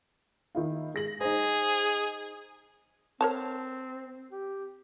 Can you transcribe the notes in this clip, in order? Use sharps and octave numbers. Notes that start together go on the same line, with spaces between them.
D#3 E4 F4
G#3 A#6 F#7
D#4 G#4 C5
C4 A#4 C#5 A5
G4